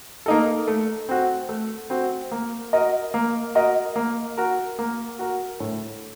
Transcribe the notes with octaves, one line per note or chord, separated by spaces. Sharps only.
A#3 D#4 A4
A3
C4 F#4
A3
C4 F#4
A#3
F#4 A#4 D#5
A#3
F#4 A#4 D#5
A#3
F#4 A#4
A#3
F#4 A#4
A2